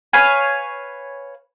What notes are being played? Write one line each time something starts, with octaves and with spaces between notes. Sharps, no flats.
B4 C#5 F5 G#5